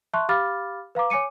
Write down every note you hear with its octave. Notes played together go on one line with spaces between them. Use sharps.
E5 A5 C6 C#6 F#6
G4 F5 B5 D6 F6 A6
B4 F5 A#5 D6
C#5 G#5 D6 C#7 D#7